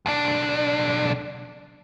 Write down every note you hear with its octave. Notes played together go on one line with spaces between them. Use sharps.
B1 D4